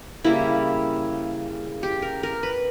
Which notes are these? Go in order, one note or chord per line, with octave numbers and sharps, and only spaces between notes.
C#3 G3 A#3 E4
G4
A#4
A#4
B4